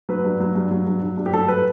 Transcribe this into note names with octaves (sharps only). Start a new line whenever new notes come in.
F#3 B4
G2
F#3
G2
F#3
G2
F#3
G2
G4
F#3 A4
B4